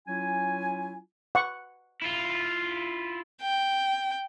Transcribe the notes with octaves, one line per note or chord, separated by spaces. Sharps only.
F#3 C#4 E4 F4 G#5
F#5 C#6
E4 F4
G5